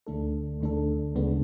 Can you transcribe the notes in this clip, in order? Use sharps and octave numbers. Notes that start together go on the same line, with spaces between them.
D2 D3 A3 D4 A4
D2 D3 A3 D4 A4
D2 C#3 G#3 B3 D4